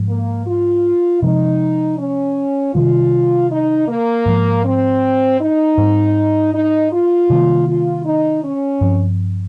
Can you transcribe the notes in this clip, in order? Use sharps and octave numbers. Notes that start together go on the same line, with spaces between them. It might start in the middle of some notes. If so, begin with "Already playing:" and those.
Already playing: G#2 F3 G#3
A#3
F4
C3 F3 G#3 C4 D#4
C#4
C3 D#3 G3 F4
D#4
A#3
G#2 F3 G#3
C4
D#4
G#2 G3 C4
D#4
F4
C3 D#3 G3 A#3
F4
D#4
C#4
G2 F3 C4